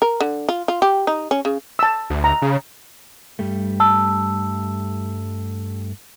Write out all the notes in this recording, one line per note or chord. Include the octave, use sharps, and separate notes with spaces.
A#4
D3
F4
F4
G4
D#4
C#4
C#3
A5 E6
D2
A#5
C#3
G2 G3 A3
A5 E6